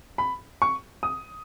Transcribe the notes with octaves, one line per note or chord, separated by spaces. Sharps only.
B5
C#6
D#6